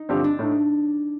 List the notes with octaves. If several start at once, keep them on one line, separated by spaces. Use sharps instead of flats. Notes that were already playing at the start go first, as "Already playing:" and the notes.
Already playing: D#4
G2 D3 F3 C4 G4
D4
A2 A3 D#4